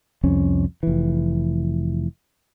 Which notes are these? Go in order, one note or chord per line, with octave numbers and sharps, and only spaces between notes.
C2 F2 C#4
F1 E3